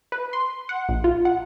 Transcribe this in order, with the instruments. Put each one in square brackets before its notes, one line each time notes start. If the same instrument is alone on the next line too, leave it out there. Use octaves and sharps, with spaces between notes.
[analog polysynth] B4
C6
F#5
A#1
F4
F#5